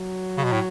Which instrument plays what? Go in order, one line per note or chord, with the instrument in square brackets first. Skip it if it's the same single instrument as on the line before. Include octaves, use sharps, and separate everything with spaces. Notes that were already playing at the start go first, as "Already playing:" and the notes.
Already playing: [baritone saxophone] F#3
[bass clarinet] C#3
B2
A2